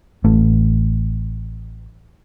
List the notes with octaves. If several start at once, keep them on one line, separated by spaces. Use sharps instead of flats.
A1 A3